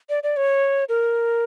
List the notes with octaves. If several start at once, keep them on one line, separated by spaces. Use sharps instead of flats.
D5
D5
C#5
A#4